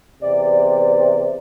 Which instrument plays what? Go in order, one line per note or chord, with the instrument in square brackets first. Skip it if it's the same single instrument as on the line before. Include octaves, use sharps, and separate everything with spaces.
[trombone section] E2 C3 [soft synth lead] D5